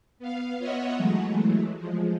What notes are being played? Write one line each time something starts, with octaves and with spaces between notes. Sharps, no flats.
B3 F5
B3 F4 C#5 D#5 E5 F#5
E3 F#3 G#3 A3
F3 G#3